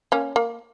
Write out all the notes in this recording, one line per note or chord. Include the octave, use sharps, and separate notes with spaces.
A#3 C#4
A#3